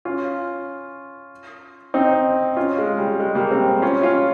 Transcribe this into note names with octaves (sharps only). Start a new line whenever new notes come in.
C#4 F4
C4 D#4
C#4 F4
G#3
G3
G#3
G3 A#3
G#3 C4
C#4 F4
C#4 F4